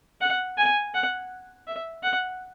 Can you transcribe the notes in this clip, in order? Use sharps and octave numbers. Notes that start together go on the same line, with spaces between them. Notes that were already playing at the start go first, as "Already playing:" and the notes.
F#5
G#5
F#5
E5
F#5